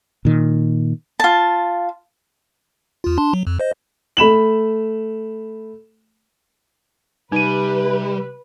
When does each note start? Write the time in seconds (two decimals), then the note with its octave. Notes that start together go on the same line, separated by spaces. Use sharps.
0.25 A#2 D#3
1.20 F4 A5
3.04 E2 F4
3.18 D4 A5 C6
3.33 F#3
3.47 F2
3.60 C5 D#5
4.17 A3 B5 E7 F#7
7.32 C3 G3 D#4 B4 D#7